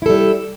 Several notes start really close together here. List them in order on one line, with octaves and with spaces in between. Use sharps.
E4 A4 G3